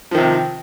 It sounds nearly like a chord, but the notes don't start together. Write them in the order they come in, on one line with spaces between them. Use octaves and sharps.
F3 D#3 C3